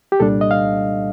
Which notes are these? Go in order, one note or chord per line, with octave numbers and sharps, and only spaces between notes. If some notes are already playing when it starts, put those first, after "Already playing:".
G4
C2 A#2 G3 D4 A4
D#5
F5